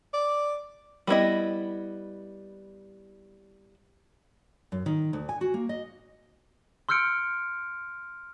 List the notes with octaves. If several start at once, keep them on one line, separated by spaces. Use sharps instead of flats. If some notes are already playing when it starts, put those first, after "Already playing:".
D5
G3 B3 E4 D#5
F#2
D#3
D2
G#5
F#4
A#3
D#5
C6 E6 F6 G6 C#7 D7